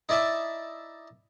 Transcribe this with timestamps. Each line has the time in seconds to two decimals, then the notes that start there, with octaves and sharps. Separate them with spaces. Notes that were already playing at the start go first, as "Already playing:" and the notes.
0.09 D#4 E4 D5 E5 A5